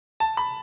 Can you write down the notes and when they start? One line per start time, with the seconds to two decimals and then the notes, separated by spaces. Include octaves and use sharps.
0.20 A5
0.37 B5